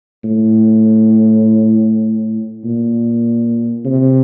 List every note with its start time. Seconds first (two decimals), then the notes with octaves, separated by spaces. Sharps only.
0.24 A2
2.65 A#2
3.85 C3